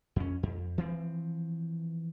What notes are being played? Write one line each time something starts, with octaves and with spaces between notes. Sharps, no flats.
F2 C#4
F2
E3 F3 C4